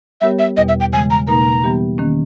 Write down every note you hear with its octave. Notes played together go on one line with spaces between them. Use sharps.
G3 B3 G4 A#4 C#5 E5
E5
E2 B2 G3 D#5
E5
G5
C#3 E3 G#3 G#5
A#5
B2 A#3 D#4 A#4 A#5
E3 G3 B3 G4
D#3 A#3 C#4